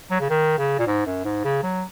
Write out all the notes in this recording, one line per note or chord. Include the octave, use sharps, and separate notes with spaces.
F#3
C#3
D#3
C#3
A#2
G#2
F#2
G#2
C#3
F#3